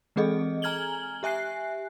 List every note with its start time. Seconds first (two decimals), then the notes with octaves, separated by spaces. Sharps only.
0.16 E3 G#3 C4 G#4 A4 D#5
0.62 G#5 A#5 F6 G#6 F#7 G7
1.23 G4 E5 G#5 F#6 C7